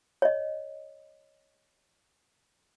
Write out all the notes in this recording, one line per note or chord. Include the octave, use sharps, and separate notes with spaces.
C#5 D#5